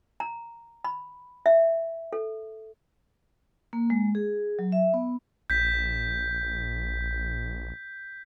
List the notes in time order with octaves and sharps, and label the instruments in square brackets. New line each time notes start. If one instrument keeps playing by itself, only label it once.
[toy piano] A#5
B5
E5
A4
[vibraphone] A#3
G#3
G#4
F#3
E5
B3
[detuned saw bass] A#1 [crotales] G6 B6